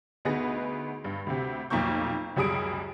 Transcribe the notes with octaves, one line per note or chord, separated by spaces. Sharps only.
D2 B3 D#4 G#4 B4 A#6
G2
D2 C3
B1 F2 A#3 A#5 C#6 G6
C#2 F#2 G3 G#4 D#6 D7